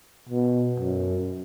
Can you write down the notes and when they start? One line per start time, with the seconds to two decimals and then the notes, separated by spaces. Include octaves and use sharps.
0.29 B2
0.80 F#2